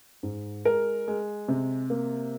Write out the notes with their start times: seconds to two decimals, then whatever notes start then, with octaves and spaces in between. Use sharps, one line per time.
0.23 G#2
0.65 G#3 A#4
1.08 G#3
1.48 C3
1.90 A#3